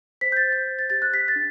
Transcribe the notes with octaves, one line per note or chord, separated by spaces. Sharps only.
C5 B6
G6
A6
C5
G6
C5
A6
G4 A6
F#6
G4 B6
A6
D4